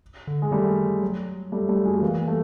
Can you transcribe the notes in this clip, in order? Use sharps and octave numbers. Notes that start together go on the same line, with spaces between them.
D3
G#3
D#3 G3 A3
F#3
G3 A3
G3 A3
F#3 G#3
A3
E3 G#3 A#3
G3 A3